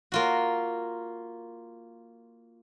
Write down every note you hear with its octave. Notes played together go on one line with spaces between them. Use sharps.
A#3 F4 F#4